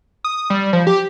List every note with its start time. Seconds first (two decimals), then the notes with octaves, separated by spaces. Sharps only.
0.24 D#6
0.50 G3
0.73 F3
0.87 G4